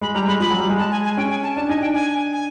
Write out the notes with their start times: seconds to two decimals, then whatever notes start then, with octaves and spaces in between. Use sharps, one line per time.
0.01 G#3 B5
0.15 G3 A#5
0.27 G#3 B5
0.40 F3 B5
0.50 F#3
0.59 G3
0.69 G#3
0.79 A5
0.92 G#5
1.05 G#5
1.17 C#4 G5
1.31 G#5
1.43 A5
1.56 D4 A5
1.69 D#4 G#5
1.81 D4 G5
1.94 G#5
2.33 G#5